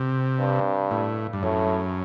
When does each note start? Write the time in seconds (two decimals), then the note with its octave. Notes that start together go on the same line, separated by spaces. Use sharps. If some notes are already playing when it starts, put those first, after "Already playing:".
Already playing: C3
0.39 G2
0.91 A2
1.33 G2
1.43 F#2 A2